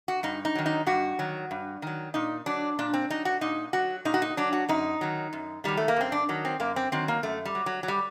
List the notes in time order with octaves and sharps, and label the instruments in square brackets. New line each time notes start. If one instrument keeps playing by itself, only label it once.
[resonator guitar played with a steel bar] F#4
G2 D#4
D#4
D#3 F#3
D#4
G2 F#4
D#3 F#3
G2
D#3 F#3
A#2 D#4
F#3 D4
A#2 D4
C4
F#3 D#4
F#4
A#2 D#4
F#3 F#4
A#2 D#4
F#4
D#4
F#3 D4
F#4
F#2 D#4
D#3 F#3
F#2
D#3 F#3 G3
A3
A#3
F#2 C4
D4
D#3 F#3
C4
F#2 A#3
C4
D#3 F#3 C4
A#3
F#2 A3
G3
F#3
F#3
F#3
G3